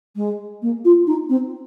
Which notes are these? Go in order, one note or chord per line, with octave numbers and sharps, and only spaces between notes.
G#3
A#3
F4
D#4
C4